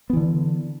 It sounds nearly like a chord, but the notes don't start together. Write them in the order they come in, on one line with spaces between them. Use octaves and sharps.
B3 E3 D3